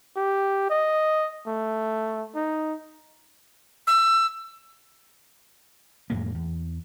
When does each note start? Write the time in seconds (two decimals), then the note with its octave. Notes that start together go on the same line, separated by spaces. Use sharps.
0.16 G4
0.70 D#5
1.47 A3
2.35 D#4
3.87 E6
6.10 F2 A2 A#3
6.35 E2